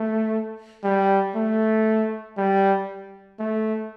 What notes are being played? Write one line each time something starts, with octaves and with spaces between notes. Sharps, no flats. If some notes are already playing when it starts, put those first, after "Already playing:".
Already playing: A3
G3
A3
G3
A3